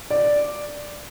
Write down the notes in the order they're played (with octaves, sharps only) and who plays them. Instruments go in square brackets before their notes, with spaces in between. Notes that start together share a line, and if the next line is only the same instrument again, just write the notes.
[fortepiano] D5